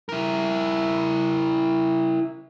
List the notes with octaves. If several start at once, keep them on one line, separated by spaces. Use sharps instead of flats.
E4 A#4